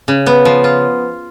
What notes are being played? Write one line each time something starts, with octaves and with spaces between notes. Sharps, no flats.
C#3
B3
F3
F4